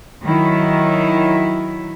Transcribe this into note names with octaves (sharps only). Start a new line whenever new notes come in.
D#3 F#3 E4